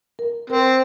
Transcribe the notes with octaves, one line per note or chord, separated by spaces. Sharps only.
A#4
C4 A#4